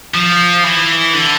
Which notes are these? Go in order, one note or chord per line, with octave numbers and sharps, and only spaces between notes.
F3
E3
D3